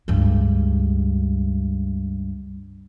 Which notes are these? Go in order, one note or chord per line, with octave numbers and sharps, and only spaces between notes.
C#2 G2